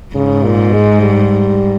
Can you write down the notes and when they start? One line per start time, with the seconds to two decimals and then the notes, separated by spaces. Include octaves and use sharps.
0.15 G#2 C#3
0.44 A#2
0.73 G#3
1.01 G3